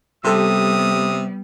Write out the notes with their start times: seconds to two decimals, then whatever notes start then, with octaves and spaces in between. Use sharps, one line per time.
0.25 C3 G3 B3 G4 A4 C6 D#6